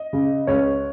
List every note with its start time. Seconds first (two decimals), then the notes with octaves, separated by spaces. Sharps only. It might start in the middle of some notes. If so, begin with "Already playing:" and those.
Already playing: D#5
0.13 C#3
0.47 C#2 C#5